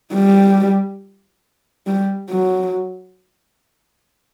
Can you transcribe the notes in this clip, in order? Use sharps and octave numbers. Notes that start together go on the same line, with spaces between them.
G3
G3
F#3